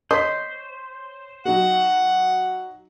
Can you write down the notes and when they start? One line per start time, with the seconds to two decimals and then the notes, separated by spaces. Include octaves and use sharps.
0.11 C5 C#5 D#5 B6
1.45 F#3 D#4 F#4 F#5